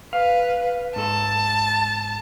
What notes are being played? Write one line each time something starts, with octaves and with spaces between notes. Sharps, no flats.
B4 F5
G#2 A4 A5